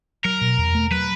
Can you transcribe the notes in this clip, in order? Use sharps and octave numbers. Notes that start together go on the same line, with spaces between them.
F#3 A#4
B2
E2
A3
F#3 B4